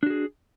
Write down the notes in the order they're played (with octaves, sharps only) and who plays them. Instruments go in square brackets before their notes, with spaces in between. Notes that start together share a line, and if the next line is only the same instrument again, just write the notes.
[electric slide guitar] D4
F#4
G#4